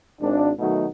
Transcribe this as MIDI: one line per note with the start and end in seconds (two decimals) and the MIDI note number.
0.21 0.51 32
0.21 0.51 62
0.59 0.88 47
0.59 0.88 51
0.59 0.88 54
0.59 0.88 57
0.59 0.88 63
0.59 0.88 66